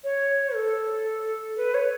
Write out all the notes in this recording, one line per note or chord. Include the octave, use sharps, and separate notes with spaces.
C#5
A4
B4
C#5